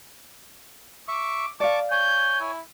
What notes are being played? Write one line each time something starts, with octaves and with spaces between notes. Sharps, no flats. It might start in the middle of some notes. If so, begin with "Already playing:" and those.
E5 C#6 D6
D5 F5 A5 C#6 D6
C#5 G#5 G6
E4